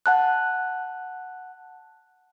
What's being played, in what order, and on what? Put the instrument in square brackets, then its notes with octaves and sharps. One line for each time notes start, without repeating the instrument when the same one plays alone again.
[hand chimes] F#5 A5 F#6